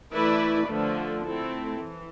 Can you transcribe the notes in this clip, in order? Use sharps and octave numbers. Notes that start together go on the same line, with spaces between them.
E3 A3 E4 B4 D5
D3 F3 A3
A3 C4 E4 A4
E3